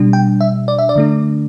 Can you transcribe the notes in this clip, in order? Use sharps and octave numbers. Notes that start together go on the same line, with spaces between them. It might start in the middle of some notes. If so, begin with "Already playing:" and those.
Already playing: B2 G3 D4
G5
E5
D5
E5
D5
D3 A3 D4